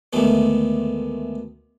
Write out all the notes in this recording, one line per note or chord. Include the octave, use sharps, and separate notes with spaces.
D2 D#3 G#3 A3 B3